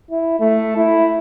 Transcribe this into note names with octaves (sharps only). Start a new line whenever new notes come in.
E4
A3
E4